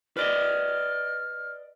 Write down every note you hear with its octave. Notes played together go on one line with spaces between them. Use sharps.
B4 D5 D#5 F6